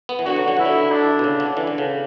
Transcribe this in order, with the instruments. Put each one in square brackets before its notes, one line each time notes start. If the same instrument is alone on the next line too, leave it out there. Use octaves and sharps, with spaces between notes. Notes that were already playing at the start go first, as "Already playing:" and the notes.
[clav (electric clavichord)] B3
E3
[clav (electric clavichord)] D3 [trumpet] F#4
[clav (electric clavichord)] F#3
D3
[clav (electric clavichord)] E3 [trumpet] E4
[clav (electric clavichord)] D3
[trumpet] D4
[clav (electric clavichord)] B2
C#3
D3
E3
D3
C#3